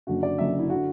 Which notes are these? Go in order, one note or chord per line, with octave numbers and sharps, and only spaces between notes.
F#1 F#2 D3 F#4
D5
F#1 F#2 D3 E5
E4
D3 F#4